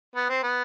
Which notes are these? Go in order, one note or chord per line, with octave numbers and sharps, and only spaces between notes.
B3
C4
B3